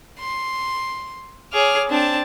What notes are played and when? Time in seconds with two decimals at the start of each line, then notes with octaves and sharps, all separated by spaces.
0.19 C6
1.53 G#4 C#5 D6 F6
1.90 C4 D4 A5